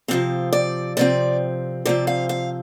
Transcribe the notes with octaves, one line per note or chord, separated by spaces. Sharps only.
C3 F3 C4 F5
D5
C3 F3 C4 D5
C3 F3 C4 D5
F5
F5